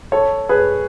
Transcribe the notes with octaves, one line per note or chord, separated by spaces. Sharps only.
A4 C#5
G#4 B4